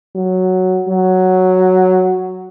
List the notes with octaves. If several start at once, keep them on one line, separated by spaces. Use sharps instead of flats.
F#3
F#3